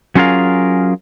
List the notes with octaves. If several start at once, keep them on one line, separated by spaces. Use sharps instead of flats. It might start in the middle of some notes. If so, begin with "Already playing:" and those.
F#3 C#4 F4 G#4 A#4 F5